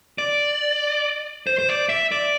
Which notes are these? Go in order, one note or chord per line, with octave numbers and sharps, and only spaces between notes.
D5
C5
C5
D5
E5
D5